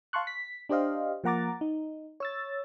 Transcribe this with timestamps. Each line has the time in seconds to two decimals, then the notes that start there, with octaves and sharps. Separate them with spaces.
0.13 F5 A5 C6 C#6 F#6
0.27 B6
0.69 D4 G4 C5 D#5 F5
1.24 F3 A#3 F#5 A#5 D6 A6
1.61 D#4
2.20 C#5 E6 A6